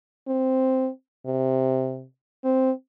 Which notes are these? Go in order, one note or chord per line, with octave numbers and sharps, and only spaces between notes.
C4
C3
C4